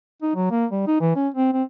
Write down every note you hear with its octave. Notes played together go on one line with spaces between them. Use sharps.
D#4
F#3
A#3
G3
D#4
E3
C#4
C4
C4